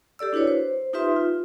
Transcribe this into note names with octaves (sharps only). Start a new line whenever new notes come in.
G4 A4 D5 E6
D4 E4 F#4 B4 C#5
C5
D#4 F4 G4 B4 E5 C6
F4